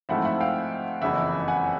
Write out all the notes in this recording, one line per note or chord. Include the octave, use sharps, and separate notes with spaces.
G#2 F3 A3 C4 E4 E5 F#5
E5 F#5
F5 G5
F#1 F2 C#3 E3 E5 F#5
F#5 G#5